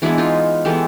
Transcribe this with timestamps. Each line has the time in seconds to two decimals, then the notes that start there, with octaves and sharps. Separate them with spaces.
0.02 E3 G#3 B3 D4 E4
0.18 D#4 F4
0.65 E3 G#3 B3 G4 A4